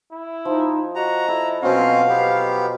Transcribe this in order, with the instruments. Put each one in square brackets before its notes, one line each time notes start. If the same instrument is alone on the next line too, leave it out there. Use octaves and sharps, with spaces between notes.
[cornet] E4
[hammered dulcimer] F3 [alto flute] D#4
[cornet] F#4 [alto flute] D#5 [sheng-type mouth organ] A#5
[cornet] E4 [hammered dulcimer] A4
[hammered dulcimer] B2 F3 F#3 [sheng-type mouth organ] C4 C#4 [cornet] F5
[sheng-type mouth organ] B3 G4